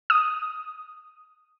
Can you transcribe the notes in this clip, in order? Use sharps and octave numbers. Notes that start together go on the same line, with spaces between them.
D#6